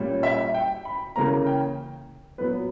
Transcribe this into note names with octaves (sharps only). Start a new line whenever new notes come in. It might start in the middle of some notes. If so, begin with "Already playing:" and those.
Already playing: A#2 G3 C#4
E5
G5
B5
C#3 E3 A#3 C#4 A#5
G5
A#2 F#3 B3 B4